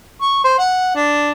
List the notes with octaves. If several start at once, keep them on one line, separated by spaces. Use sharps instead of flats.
C#6
C5
F#5
D4